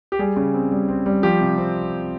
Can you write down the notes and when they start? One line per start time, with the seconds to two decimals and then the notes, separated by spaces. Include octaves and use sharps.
0.12 G4
0.19 G3 G#4
0.37 C#3
0.54 C4
0.72 G3
0.89 C4
1.06 G3
1.23 F3 G4
1.41 C3
1.58 C4